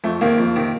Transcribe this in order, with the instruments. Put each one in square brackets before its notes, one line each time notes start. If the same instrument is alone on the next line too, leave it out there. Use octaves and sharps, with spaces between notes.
[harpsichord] F2 [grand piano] A3
[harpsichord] C3 D#3 [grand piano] A#3
[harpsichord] F2
C3 D#3